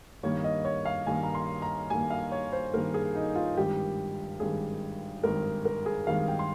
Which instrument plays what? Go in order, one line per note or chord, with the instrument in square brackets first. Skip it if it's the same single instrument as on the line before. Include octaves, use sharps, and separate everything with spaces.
[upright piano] G2 D#3 A#3 C#5
D#5
C#5
F5
G2 D#3 A#3 G#5
A#5
C6
A#5
G2 D#3 A#3 G#5
F5
C#5
C5
G2 D#3 A#3 A#4
G#4
D#4
F4
G#1 G2 D#3 G4
G#1 G2 D#3 G#4
G#1 G2 D#3 A#4
A#4
G#4
G#1 G2 D#3 F5
G5
C6